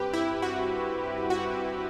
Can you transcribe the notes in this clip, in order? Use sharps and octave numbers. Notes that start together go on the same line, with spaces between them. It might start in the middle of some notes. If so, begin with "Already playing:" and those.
Already playing: G2 C4 G4 B4
E4
F#4
F#4